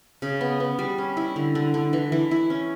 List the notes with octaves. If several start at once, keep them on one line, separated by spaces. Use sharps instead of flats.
C#3
B3
B3
G3
C#4
E4
D3
D3
D3
E3
E3
E4
C#4